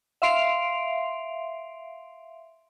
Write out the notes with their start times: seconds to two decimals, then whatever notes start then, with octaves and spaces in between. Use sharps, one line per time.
0.22 E5 F5 C6 C7 D7 F7